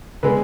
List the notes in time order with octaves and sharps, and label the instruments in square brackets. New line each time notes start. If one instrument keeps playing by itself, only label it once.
[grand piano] D3 G#3 B3 B4